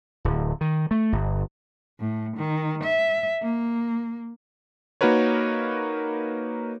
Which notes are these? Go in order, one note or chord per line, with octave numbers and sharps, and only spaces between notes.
D1
D#3
A3
G1
A2
D#3
E5
A#3
A#3 D#4 F#4 A#4 B4 C#5